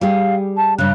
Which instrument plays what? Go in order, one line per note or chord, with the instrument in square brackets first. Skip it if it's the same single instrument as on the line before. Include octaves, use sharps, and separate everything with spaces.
[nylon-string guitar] G3 G4 G#4 [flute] F5
[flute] A5
[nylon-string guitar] G2 C#3 [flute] F#6